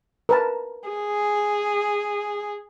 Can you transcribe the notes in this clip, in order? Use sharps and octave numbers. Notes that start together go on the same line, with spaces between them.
A#4 B4 A5
G#4